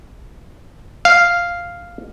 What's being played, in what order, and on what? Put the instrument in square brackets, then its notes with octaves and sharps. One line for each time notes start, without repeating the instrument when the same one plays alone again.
[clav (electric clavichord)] F5